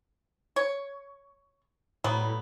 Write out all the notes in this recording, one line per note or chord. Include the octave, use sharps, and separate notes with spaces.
C#5
A2 F#3 G3 B3